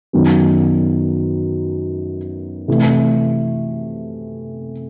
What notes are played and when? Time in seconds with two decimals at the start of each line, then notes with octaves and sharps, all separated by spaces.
0.13 F#2 D#3 F#3 B3
2.68 C3 E3 A3